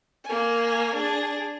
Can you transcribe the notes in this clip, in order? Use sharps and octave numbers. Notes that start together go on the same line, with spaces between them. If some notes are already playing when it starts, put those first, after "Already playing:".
A#3 G#5
D4 G#4